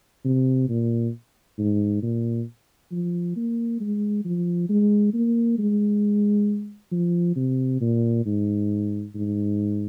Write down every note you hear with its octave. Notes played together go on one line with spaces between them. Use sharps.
C3
A#2
G#2
A#2
F3
A#3
G#3
F3
G#3
A#3
G#3
F3
C3
A#2
G#2
G#2